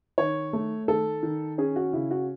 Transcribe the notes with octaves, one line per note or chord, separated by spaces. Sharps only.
D#3 C#5
A3
D#3 A4
D#3
C#4 G#4
F#4
C#3 E4
F#4